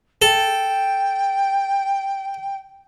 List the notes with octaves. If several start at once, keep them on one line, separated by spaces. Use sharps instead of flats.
A4 G5